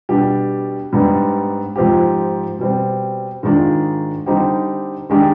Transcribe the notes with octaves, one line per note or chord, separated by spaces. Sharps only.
B2 G3 D4 G4
G#2 G3 B3 D4
G#2 F3 C4 G4
B2 G3 C4
G#2 D#3 G#3 D4 F4
D3 G3 C4 D#4 G4
D#3 G#3 D4 G4